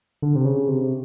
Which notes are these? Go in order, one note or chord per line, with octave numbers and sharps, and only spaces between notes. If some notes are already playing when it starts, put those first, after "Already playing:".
D3
C3
C#3
C3